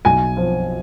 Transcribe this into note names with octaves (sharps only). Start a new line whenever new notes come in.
B1 G#5
F3